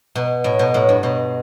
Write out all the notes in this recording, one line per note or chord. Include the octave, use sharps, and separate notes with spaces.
B2
A2
B2
A2
G2
B2